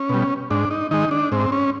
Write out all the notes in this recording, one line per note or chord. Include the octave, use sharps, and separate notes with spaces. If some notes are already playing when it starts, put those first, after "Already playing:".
Already playing: C#4
B2 G3
G#2 D4
D#4
D#3 G#3 D#4
D4
G#2 C4
C#4